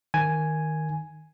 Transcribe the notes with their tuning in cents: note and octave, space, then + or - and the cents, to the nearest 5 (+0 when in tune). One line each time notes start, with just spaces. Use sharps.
D#3 +0 G#5 +0